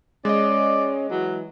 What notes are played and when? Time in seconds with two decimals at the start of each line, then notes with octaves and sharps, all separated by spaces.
0.25 G#3 C#4 D5 D#5
1.11 E3 F#3